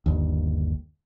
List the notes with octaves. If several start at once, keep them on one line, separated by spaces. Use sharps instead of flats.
G1 D#2